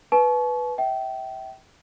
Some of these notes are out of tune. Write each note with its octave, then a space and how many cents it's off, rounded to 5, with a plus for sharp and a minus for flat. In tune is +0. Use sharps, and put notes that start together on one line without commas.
B4 +0 A5 -45 C#6 +10
E5 -25 G5 -25